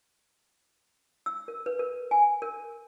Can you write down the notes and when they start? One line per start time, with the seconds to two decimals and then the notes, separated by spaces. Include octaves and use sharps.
1.26 E6
1.48 A#4
1.66 B4
1.79 A#4
2.11 G#5
2.42 A#4